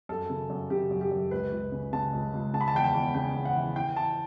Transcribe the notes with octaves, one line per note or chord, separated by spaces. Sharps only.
F#2 A4
C#3
F#2
C#3 G4
F#2
G4
F#2
C#2 B4
C#2
C#3
C#3 A5
C#2
C#2
C#3 A5
B5
A5
E2 G5
A5
E2
C#3 G5
E2
F#5
E3
E3 G5
E3 A5